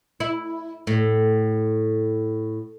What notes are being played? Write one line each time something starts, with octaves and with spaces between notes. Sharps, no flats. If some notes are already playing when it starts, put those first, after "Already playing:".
E4
A2